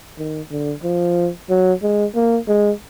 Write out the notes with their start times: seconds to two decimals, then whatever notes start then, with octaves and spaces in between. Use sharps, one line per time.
0.18 D#3
0.51 D3
0.84 F3
1.50 F#3
1.83 G#3
2.15 A#3
2.48 G#3